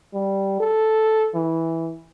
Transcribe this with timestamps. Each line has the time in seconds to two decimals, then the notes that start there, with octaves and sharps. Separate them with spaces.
0.14 G3
0.60 A4
1.34 E3